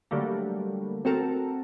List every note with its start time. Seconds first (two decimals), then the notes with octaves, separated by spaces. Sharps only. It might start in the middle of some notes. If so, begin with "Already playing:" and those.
0.11 D3 F#3 G3 A3 A#3
1.05 C4 F#4 A4 A#4